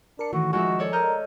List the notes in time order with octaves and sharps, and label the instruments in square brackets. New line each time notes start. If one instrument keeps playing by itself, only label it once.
[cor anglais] D4 [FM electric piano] A#4 C#7
[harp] A2 [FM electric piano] D#3 E3 [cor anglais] F#4
[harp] D#3 G#3 E5 [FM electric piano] F3 G#5 [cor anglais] F#4
[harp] A4 C#5 D5
[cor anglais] A#4 [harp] D#5 F6 G6